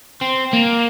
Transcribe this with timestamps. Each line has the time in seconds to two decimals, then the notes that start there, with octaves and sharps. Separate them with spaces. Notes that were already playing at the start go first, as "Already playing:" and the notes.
0.21 C4
0.53 A#3